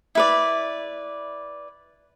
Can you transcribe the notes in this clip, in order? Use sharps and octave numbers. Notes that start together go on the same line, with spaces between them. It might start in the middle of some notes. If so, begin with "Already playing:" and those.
E4 B4 D5